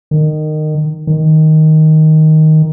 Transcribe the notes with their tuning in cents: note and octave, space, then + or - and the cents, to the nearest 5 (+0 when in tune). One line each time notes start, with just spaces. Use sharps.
D#3 -20
D#3 +5